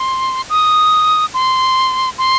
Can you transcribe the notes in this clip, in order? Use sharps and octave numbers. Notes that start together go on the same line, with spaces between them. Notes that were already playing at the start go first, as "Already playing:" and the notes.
Already playing: C6
D#6
C6
C6